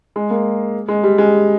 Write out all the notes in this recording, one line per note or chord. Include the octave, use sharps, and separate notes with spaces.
G#3
A#3
G#3
G3
G#3